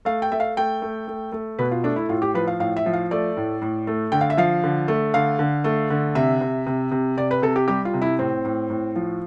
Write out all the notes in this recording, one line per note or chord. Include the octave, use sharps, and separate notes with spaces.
A3 F5
G5
A3 E5
F5
A3 G5
A3
A3
A3
B2 B4
F4
A3 D4
E4
A2 F4
G4
F3 B4
F5
A2 F5
E5
F3
F5
A3 D5
A2
A2
A3
D3 G5
F5
E5
F3 F5
D3
A3
D3 F5
D3
A3
D3
C3 E5
C3
C3
C3
C3 D5
B4
C3 A4
G4
G3 G4
F4
C3
E4
A2 C4
A2
A2
F3